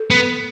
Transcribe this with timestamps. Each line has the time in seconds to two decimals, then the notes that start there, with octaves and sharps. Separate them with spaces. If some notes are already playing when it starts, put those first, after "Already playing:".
Already playing: A4
0.10 B3